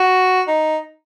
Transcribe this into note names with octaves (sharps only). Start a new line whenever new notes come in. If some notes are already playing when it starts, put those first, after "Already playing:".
Already playing: F#4
D#4